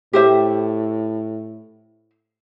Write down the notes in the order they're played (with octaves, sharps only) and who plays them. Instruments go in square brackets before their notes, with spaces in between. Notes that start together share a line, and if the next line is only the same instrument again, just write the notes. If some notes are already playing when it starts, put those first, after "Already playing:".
[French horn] A2 [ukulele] G4 C5 E5